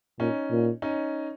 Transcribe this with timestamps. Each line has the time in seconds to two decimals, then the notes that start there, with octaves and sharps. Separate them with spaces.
0.19 A#2 C#4 D#4
0.51 A#2
0.82 C#4 D#4